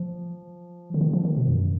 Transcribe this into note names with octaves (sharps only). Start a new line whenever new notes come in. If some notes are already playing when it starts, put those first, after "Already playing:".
Already playing: F3
D3
D#3
F3
D#3
B2
F#2